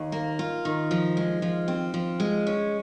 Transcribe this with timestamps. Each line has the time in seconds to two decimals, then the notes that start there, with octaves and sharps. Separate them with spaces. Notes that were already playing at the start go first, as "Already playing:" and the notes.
Already playing: D#2
0.12 A#3
0.39 F4
0.65 D#3
0.91 F3
1.17 G#3
1.42 F3
1.68 C4
1.94 F3
2.20 G#3
2.47 C#4